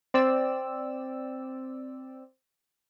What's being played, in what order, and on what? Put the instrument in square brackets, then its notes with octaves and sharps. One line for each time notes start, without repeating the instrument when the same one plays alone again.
[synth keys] C4 D5 E6